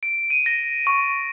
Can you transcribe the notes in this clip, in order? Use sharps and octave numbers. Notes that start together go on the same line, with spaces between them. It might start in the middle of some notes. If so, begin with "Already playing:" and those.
D7
D#7
A#6
C#6